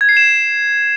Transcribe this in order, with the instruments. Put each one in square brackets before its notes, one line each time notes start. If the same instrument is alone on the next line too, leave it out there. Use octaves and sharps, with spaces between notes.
[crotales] G#6
C7
E7